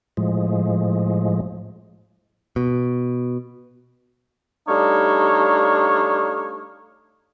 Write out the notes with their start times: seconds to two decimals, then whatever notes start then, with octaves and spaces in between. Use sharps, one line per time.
0.17 A2 F3 G#3
2.56 B2
4.68 G3 A3 D4 D#4 C#5 F5